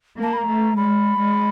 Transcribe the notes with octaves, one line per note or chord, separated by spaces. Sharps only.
A#3 A5
B5
A#5
A3
G#3 B5
G#3